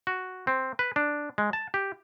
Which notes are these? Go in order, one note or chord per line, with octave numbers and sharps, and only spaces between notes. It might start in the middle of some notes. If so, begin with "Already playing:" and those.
F#4
C4
B4
D4
G#3
A5
G4